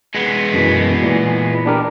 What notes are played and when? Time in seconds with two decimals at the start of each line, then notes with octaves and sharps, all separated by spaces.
0.15 G#3 B3
0.54 F#2 B2 E3
1.03 A#2 E3
1.66 D4 G4 A#4